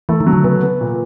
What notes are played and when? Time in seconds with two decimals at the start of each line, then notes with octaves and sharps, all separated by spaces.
0.09 E3 A3
0.20 D#3
0.27 F#3
0.33 D3
0.44 C#3 B3
0.62 B3
0.81 A#2